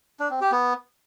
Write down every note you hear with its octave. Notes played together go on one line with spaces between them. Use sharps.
D4
C4
G4
B3